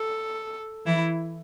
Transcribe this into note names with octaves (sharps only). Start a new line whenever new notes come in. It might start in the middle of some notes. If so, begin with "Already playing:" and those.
Already playing: A4
E3 E4